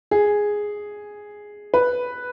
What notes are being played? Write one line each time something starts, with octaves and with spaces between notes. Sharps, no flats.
G#4
B4